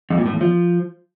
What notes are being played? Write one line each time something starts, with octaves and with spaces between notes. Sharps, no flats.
F2
A#2
A2
E2
F3